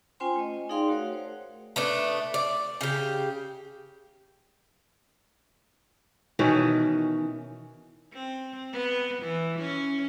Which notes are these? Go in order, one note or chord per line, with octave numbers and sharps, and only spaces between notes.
C#4 F4 C5 G5 G#5 C6
A3 D#5
D#4 G#4 D5 F5 G5 C6
A3 F#4 A#4 C#5 F#5
C5
A3 B3 D4
D5
C#3 G4
B2 D#3 E3 C#4
C4
B3
E3
C#4